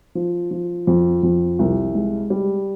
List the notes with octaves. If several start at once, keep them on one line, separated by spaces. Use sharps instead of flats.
F3
F3
F2
F2
C2
G#3
G3